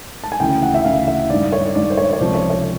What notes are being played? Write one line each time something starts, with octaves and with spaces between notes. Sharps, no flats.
A5
G#5
D2 C#3 E3 G5
F#5
E5
D2 C#3 E3 F5
E5
G2 D#3 D5
C#5
G2 D#3 D5
C5
C#5
C#5
C#2 C3 F3 C5
C#5
C#5